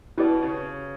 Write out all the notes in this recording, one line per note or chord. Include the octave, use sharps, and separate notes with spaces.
B2 E4 G4 B4 D5
C#3